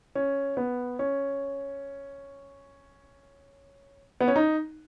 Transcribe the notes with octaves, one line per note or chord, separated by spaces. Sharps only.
C#4
B3
C#4
B3
C#4
D#4